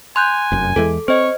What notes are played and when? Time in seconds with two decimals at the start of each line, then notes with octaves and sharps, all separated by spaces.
0.16 G#5 C6 F#6 G6
0.52 F1 F#2
0.76 E2 E3 G#3 A4
1.08 C4 C5 C#5 D#5